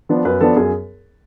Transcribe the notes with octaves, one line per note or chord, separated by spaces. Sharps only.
F3 B3 D4
F#2 B4
F3 B3 D4 A4
F#2 G#4